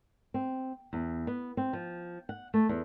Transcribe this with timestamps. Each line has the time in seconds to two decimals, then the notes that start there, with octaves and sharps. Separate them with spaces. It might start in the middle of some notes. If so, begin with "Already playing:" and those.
0.34 C4
0.93 E2
1.27 B3
1.57 C4
1.73 F3
2.29 F#5
2.54 A3
2.69 E2